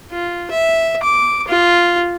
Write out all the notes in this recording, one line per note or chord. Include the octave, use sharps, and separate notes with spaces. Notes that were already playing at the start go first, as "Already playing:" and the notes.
F4
E5
D6
F4